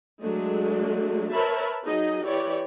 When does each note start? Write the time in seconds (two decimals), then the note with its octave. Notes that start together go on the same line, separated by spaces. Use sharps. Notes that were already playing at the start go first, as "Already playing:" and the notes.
0.21 F#3 G#3 A3 D4
1.32 A#4 B4 C#5 E5 A5 B5
1.85 F#3 D#4 G#4 D#5
2.25 E3 G4 C#5 D5